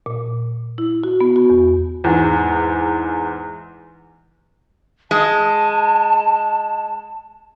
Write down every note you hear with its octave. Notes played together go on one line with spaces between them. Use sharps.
A#2
E4
F#4
B3
F#4
E2
E2 G#2
G#3 A5